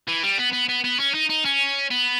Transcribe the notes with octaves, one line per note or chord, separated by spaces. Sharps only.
E3
G3
B3
B3
B3
B3
C#4
D#4
D#4
C#4
B3